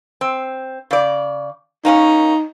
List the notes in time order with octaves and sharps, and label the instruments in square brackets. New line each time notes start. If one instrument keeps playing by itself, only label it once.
[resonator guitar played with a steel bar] C4
C#3 D5
[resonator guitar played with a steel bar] A#3 C4 C#4 [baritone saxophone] D#4